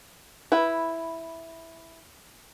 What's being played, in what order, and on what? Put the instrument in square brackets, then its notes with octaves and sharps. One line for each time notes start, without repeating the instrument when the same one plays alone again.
[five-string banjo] E4 B4